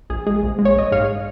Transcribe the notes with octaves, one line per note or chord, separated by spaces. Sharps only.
A#1 G#4
G#3 G#4
A#1
G#3
C#5
A#1 D#5
G#2 C#5 F5